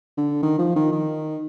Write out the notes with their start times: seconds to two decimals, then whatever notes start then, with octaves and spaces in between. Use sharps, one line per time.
0.17 D3
0.43 D#3
0.58 F3
0.76 D#3
0.92 D#3